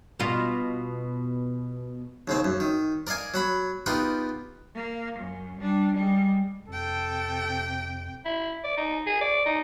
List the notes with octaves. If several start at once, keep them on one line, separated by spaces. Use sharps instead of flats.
B2 F4
D#2 C#3 C4
F#2
D#3
A#4 D5 D#5 F5 G#5
F#3 F#5 B5
B3 D#4 F4 G4 A#4 F#5
A#3
F#2
G3 D4
G3 G#3
F2 C3 A4 G5
E4
D5
D#4
G#4
D5
D#4